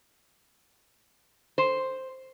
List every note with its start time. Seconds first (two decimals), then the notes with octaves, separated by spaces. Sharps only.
1.58 C5